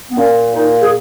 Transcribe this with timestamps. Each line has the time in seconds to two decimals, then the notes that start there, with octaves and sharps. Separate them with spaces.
0.10 B3
0.17 A#2 C#4
0.54 A#2 D#4
0.82 G#4